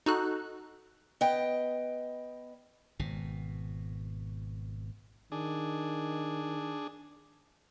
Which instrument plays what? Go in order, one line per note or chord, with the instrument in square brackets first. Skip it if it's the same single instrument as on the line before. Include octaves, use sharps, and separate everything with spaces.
[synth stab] D#4 F#4 A4 F#6
[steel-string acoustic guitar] B3 D#5 G5
[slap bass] G#1 B2
[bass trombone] D#3 [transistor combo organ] D4 G#4